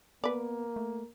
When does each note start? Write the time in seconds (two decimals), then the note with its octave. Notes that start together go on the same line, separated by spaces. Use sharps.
0.24 A#3 B3 B4 D5
0.76 A3